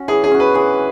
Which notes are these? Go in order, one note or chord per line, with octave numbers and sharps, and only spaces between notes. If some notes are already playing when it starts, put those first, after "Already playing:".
Already playing: C#4 F#4
E3 G#4
G#4
C#4 F#4
B4
E3 G#4